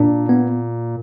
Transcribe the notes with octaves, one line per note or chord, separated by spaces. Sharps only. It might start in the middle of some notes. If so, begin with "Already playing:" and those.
Already playing: A#2 D4
B3